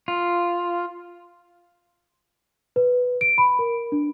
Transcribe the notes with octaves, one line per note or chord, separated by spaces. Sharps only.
F4
B4
D7
B5
A#4
D4